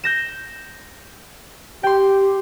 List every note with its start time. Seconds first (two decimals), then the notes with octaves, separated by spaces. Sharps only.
0.04 G6 A#6 E7
1.83 G4 G5 C6